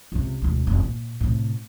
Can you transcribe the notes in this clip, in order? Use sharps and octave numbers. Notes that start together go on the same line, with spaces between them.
C#2 C3
E1 D2
F1
A#2
A2 C3